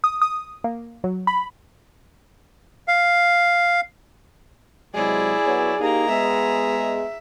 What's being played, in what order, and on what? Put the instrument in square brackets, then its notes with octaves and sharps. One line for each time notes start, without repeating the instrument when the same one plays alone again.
[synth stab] D#6
D#6
A#3
F#3
B5
[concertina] F5
[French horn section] C3 F#3 G#3 [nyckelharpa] E4 D5 [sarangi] G#4
[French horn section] F#3 B3 C#5
[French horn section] A#3 D#4 G4 [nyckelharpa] G#4 A#5
[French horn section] G#3 B3 [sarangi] E5